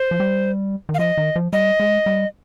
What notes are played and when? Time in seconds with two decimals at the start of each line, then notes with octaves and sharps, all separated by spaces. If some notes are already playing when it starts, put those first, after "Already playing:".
Already playing: C5
0.11 F3
0.20 G3
0.89 D#3
0.94 F5
0.99 F3 D#5
1.17 D#3
1.36 F3
1.53 G3 D#5
1.80 G#3
2.06 G3